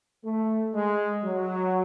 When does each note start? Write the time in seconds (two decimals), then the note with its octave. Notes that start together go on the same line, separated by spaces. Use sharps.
0.25 A3
0.74 G#3
1.24 F#3